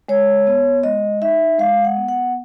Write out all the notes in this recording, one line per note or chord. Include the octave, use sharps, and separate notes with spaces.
G#3 C#5
B3
G#3 D#5
D#4 E5
G#3 F5
F#5
B3
F#5